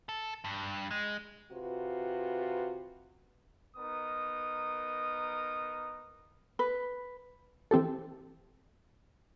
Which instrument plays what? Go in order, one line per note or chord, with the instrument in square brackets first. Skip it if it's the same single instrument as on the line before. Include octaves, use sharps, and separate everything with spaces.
[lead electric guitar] A4
G2
G#3
[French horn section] C3 F4 F#4 B4
[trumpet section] B3 D#4 A#4 D#6
[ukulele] B4
[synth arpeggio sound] E3 C4 G4 A4